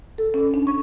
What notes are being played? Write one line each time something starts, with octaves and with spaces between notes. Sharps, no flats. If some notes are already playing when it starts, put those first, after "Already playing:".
A4
C#4
D4
C#6